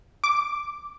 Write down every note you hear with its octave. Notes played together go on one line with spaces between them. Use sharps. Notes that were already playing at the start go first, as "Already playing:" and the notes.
D6